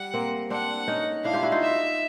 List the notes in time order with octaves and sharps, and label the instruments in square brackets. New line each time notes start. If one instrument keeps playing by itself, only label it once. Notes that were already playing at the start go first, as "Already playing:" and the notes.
Already playing: [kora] G3 [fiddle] F#5
[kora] A#3 C4
[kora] C4 D4 [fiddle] F#5
[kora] C#4 D#4
[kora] D4 E4 [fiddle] F5
[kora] F4 G4
E4 F#4
D#4 F4
[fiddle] E5